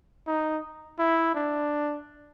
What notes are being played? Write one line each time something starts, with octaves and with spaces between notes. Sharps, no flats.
D#4
E4
D4